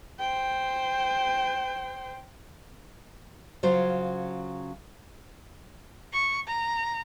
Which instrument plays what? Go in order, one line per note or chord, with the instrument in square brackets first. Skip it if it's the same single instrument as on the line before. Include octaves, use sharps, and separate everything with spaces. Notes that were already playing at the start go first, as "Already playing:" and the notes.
[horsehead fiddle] C5 G5
[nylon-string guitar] C#3 F#3 F4 C5
[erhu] C#6
A#5